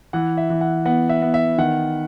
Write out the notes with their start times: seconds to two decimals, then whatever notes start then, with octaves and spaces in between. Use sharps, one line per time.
0.13 E3 F#5
0.37 E5
0.50 E3
0.61 F#5
0.85 B3 F#5
1.09 E5
1.22 B3
1.34 E5
1.58 D#3 F#5